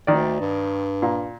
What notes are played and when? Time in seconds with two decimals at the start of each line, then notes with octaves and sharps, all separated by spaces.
0.07 D2 D#3 D5
0.40 G2
1.02 A#2